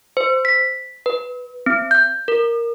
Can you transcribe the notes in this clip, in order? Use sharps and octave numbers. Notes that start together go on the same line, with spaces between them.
C5
B6
B4
C4
G6
A#4